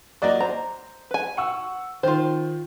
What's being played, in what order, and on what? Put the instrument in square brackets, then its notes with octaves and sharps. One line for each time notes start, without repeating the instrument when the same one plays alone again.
[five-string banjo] F#3 A#3 F4 [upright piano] F#4 D5 D#5
[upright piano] C5 [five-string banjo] A#5
[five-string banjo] B4 G#5
[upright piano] F#5 C#6 E6
[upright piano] D#3 [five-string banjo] F4 C5